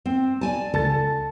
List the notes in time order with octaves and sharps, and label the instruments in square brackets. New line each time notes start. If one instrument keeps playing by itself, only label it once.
[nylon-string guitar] C4
D5 G#5 A5
[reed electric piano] C#2 A5 A6 [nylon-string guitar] A4